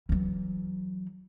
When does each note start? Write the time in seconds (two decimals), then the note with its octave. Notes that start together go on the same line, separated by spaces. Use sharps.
0.09 E3 F#3